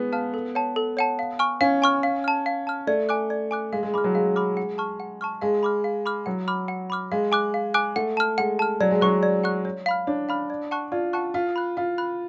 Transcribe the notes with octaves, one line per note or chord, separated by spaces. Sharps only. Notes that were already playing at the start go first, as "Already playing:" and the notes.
Already playing: G#3 B3
F5 A5 F6
A4
C#5 F#5 A5
A4
C#5 F#5 A5
F5
G#5 C#6 F6
C#4 F5
G#5 C#6 F6
F5
A5 F6
F5
A5 F6
A3 D5
G#5 D6 F#6
D5
G#5 D6 F#6
G#3 F5
G#3
G#3 B5 D6 F6
F#3
G#3 F5
B5 D6 F6
F#5
A5 C#6 F6
F#5
A5 C#6 F6
G#3 F5
B5 D6 F6
F5
B5 D6 F6
F#3 F#5
B5 D6 F6
F#5
B5 D6 F6
G#3 F5
G#5 D6 F#6
F5
G#5 D6 F#6
A3 F#5
A5 F6
G#3 F#5
A5 F6
F#3 D5
G#3
F#3 F#5 C#6 F#6
D5
F#5 C#6 F#6
C#5
F5 B5 F6
D4 C#5
F5 B5 F6
D5
F#5 A5 C#6 F#6
F4 D5
F#5 A5 C#6 F#6
F4 F5
B5 F#6
F4 F5
B5 F#6